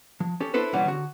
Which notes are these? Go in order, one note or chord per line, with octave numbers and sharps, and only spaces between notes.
F3
C#4 G4 A4
D4 E4 A4 B4 C5
B1 A#2 E3 G3 C#4 F#5
D3 F#4